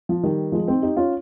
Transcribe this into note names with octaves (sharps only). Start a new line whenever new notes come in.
F3
D#3 G3
F3 G#3
C4 D#4
D#4 G4
C#4 F4